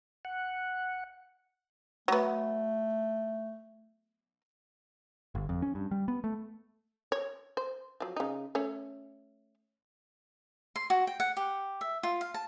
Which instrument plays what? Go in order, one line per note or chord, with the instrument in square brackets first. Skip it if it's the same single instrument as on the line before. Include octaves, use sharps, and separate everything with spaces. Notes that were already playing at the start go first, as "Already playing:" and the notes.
[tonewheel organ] F#5
[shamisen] F#3 B3 [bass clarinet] A3
[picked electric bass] G1
F2
C#4
G2
G3
B3
A3
[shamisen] C#5
C5
F3 F#3
C#3 D#4
A3 C#4 C#5
[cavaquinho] C6
F#4
G5
F#5
G4
E5
F4
F5
A5